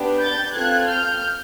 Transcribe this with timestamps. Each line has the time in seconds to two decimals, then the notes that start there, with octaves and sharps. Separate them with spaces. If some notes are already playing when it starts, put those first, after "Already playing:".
Already playing: B3 D4 G4
0.20 G6 A6
0.54 C4 F4 A4 F#6 G#6
0.87 F6 G6